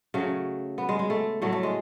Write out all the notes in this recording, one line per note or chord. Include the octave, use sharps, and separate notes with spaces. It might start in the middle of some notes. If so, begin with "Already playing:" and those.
C#3 F#3 A3
B3
G#3
G#3
A3
A2 F#3 A3
A3
G#3